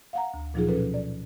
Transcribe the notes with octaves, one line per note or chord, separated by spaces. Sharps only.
F5 F#5 A#5
D2
A#2 F3 F#3 D#4 F4 G#4
B2 C#4 A4 B4
D5